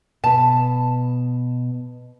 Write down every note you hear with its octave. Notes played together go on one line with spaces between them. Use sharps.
B2 B4 A5